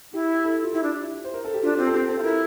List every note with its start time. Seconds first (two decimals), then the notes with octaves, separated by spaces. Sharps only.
0.13 E4 G4
0.33 G4
0.44 A4
0.63 F4
0.73 E4 G4
0.83 D4
1.03 E4
1.24 C5
1.34 A#4
1.45 A4
1.53 G4
1.63 D4 F4
1.78 C4 F4
1.87 A4
1.93 C4 G4
2.08 C4 A4
2.18 F4
2.23 E4 A#4